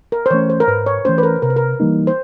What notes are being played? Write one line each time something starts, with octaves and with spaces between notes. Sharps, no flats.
A#4
C5
E3 A3 C#4 C#5
C5
A#4
G#2 B4
C#5
E3 A3 C#4 C5
B4
A#4
C3 A#4
B4
A#4
E3 G3 A#3 D#4
C5